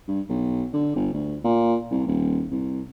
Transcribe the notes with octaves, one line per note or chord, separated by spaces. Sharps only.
G2
B1
D3
G1
D2
A#2
C2
D#1
C2